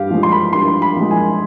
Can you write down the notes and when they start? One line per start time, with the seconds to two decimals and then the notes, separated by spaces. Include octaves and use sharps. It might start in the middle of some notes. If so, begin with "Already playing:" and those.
Already playing: G2 G4 F5
0.10 F3 G#3
0.23 C6
0.32 B5
0.53 G2 C6
0.82 B5
0.97 F3 G#3
1.11 G#5